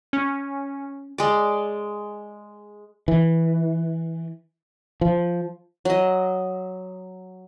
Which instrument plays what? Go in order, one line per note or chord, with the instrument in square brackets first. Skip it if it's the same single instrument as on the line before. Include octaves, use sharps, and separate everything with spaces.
[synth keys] C#4
[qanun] G#3 D5
[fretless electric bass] E3
F3
[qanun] F#3 D#5